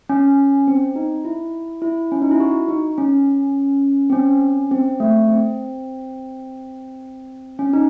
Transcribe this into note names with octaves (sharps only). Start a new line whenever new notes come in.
C#4
C4
D#4
E4
E4
C#4
D#4
E4
F#4
D#4
C#4
C4
C#4
C4
A3
C4
C#4
D#4